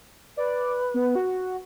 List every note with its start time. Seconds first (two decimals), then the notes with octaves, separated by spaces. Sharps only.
0.37 B4 D5
0.94 B3
1.15 F#4